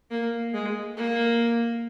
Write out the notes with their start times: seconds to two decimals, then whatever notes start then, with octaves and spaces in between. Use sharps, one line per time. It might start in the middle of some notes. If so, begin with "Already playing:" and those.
0.11 A#3
0.54 G#3
0.96 A#3